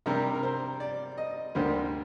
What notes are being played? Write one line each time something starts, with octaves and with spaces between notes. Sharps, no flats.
C3 G3 D4 A#4
A#4
C5
D5
D#5
D2 D3 G3 A#3 C5